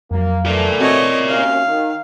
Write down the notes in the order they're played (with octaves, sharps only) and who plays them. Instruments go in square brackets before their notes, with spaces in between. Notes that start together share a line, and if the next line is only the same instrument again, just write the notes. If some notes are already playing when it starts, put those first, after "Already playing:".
[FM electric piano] F2 F#3 [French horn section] A#3
[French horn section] D3 E3 A3 [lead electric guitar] A#4 D5
[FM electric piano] C4 F#4 E5 [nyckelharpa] C#5 D#5
[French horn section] D#2 C#4 [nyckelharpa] F5
[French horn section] D#3